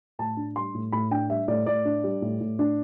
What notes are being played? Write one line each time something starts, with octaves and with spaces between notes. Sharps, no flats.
A2 A5
D4
G3 C6
A2
A2 B5
D4 G5
G3 E5
A2 D5
A2 D5
D4
G3
A2
A2
D4